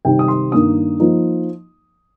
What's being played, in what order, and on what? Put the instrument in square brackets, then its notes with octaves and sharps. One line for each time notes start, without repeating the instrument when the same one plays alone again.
[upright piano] C3 D#3 G3 C4 D#4 G5
D#6
C6
G2 D#3 A#3 D#4 D#6
F3 A#3 D#4